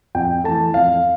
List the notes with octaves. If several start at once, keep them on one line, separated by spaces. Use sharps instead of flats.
F2 G5
E3 A3 A5
F2 F5